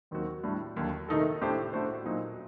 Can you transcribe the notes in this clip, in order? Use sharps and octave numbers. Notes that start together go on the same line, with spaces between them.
D#2 D#3 F#3 C4 F#4
A2 G3 D4
D#2 D3 F#3
C3 D#3 A3 D#4 A4
A2 A3 D4 G4 C5
A2 A3 D4 F#4 C5
A#2 F#3 C4 D#4